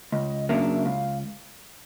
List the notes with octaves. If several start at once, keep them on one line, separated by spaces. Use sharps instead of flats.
C#2 D#5
C#3 F#3 A#3 D4 E5
C#2 F5